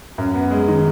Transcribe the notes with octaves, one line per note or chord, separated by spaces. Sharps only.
F#2
B3
G#3
D#3